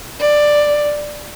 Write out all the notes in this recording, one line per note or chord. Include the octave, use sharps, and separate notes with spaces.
D5